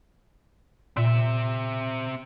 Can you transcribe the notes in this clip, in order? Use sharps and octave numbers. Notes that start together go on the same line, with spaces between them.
A#2 C4 E5